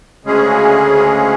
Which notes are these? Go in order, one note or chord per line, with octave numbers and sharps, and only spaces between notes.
D2 C#3 G#3 C#4 G#4